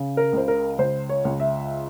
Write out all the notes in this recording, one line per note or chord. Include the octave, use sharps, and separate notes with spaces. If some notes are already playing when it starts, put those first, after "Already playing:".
Already playing: C#3
A#4
C#2 C5
A#4
C#2 C5
C#5
C#2
E5